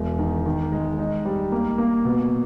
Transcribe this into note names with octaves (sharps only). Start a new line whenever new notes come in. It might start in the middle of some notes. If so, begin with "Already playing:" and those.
Already playing: E1
D#3
D#3
G#3
D#4
G3
A#3
A#3
B2